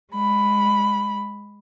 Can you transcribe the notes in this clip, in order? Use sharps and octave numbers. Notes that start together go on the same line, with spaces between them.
G#3 B5